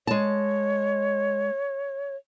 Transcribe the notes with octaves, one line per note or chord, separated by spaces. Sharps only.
G#3 C#5 A5